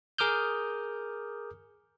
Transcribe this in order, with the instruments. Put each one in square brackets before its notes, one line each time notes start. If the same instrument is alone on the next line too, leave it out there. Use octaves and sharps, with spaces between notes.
[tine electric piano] G#4 A#4 D6 D#6 F6 G6